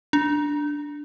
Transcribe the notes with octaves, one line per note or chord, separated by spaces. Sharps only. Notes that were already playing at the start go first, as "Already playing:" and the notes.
D4